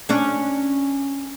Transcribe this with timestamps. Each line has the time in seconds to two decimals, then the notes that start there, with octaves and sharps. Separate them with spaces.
0.09 C#4 D4 G#4